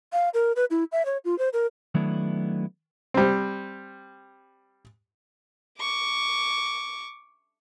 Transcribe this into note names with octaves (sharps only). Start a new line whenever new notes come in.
F5
A#4
B4
E4
E5
C#5
F4
C5
A#4
D#3 F#3 A3 B3 D4 E4
G3 C4
C#6 D6